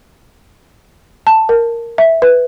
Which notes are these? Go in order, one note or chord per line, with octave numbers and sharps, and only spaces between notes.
A5
A#4
E5
B4